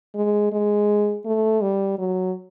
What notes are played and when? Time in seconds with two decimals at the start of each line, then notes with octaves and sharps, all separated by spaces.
0.15 G#3
0.52 G#3
1.26 A3
1.62 G3
1.99 F#3